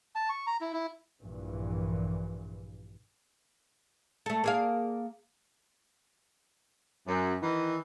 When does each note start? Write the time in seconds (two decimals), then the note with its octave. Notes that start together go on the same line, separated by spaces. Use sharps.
0.15 A5
0.29 C#6
0.47 A#5
0.61 E4
0.73 E4
1.22 A#1 G2 A#2 E3
4.26 A3 A4
4.44 A#3 G#4 F5
7.07 F#2
7.42 D#3 E3